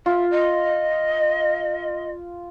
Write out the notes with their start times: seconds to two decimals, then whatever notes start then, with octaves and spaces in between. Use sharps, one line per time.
0.06 F4 E5
0.30 D#5